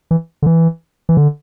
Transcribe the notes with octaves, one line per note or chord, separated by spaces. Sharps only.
E3
D3
E3
E3
D3